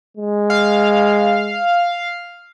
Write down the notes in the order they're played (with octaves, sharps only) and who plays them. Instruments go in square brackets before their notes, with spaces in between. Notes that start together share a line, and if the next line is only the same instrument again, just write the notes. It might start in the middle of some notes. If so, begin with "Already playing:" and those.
[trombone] G#3
[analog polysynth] F5